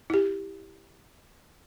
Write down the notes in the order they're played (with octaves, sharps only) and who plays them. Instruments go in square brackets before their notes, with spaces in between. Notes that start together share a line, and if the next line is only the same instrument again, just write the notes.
[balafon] E4 G4